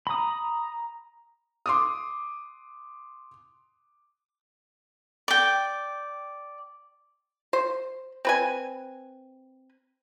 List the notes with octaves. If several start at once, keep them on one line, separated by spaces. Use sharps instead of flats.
A#5 B5 D#6
C6 D6 D#6
D5 G5
C5
C4 B4 G#5